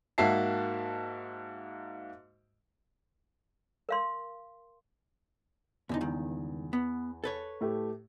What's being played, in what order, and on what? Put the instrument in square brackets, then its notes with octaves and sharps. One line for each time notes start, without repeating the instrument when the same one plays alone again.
[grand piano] G#2 A#3 F#4 E5 A5 C7
[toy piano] A#4 F5 C6
[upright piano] E2 [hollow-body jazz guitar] A2 D3 D#4
[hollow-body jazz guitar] C#2 G2 D#3
B3
A4 B4 C#5
[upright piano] A2 A3 G4